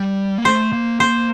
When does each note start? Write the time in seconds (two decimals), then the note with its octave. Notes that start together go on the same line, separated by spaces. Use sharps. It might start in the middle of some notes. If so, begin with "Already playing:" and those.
Already playing: G3
0.38 A#3
0.44 A3 C5
0.73 A#3
1.00 A#3 C5